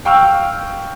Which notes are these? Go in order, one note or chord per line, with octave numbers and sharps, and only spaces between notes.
F5 G5 C#6 E6 F6